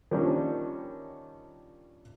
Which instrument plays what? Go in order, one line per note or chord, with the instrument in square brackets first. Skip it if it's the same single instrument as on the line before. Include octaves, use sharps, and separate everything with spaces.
[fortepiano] D#3 F3 G3 A#3 C#4 D4